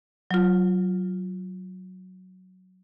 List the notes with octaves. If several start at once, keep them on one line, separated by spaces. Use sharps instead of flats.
F#3 F4